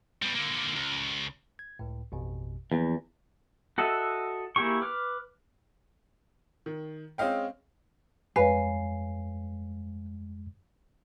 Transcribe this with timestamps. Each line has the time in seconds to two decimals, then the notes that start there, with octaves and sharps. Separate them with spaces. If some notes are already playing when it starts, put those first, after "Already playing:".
0.22 B2 G3
0.35 D3 A#3
0.76 C#2
1.59 G#6
1.79 C#2 A2
2.12 A1 F2 B2
2.72 E2 F3 A#3 B4
3.78 F#4 A4 D#5 E5
4.56 A#3 E4 G4 G#4 C#6
4.81 B4 D6 F6
6.66 D#3
7.18 G#3 C4 C#4 D#5 F5 G5
8.36 F2 G#3 B4 C#5 F5 G#5 C7